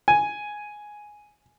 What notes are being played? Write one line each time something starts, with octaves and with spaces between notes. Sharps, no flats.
G#5